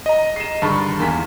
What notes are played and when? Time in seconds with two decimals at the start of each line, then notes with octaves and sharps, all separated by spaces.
0.06 D#5 A#5
0.36 C7 E7
0.62 G2 D3 D#3 A5 B5 C#6
0.99 E2 G#2 A#3 G#5 A5 B6